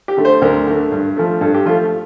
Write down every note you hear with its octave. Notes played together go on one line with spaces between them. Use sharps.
G4
D3 A3
C5
D2 A#4
D3 A3
G2
F3 A3
G2 A4
G4
F3 A3 F4